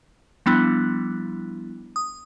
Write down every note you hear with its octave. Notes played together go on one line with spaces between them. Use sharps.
F3 G3 B3 D4 E4
D#6